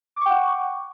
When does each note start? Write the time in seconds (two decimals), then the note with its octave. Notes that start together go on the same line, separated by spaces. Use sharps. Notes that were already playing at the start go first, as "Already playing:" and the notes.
0.16 D6
0.21 C#6
0.26 G5
0.30 F#5